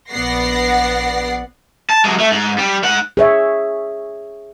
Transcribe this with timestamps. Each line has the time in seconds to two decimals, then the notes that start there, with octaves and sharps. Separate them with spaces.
0.10 A#1 B3 D5 F#5 A#6 C7
1.90 A5
2.05 F#3 G#3
2.19 A3
2.32 G#2
2.58 G3
2.84 G#2 F#5
3.17 G#4 C#5 E5